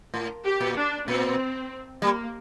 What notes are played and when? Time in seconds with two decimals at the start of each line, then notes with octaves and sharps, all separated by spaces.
0.14 A2
0.45 G4
0.61 A#2
0.76 D4
1.08 A#2 C4
2.02 G3 A#3